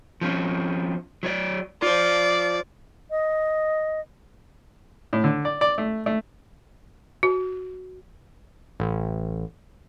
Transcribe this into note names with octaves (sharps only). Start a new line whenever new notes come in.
F3 C4 C#4
F#3 C#5 D5
F4 C5 D5
D#5
A2
D3
D5
D5
A3
A3
F#4
A1